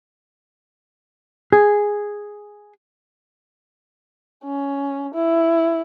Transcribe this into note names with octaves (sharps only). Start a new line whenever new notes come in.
G#4
C#4
E4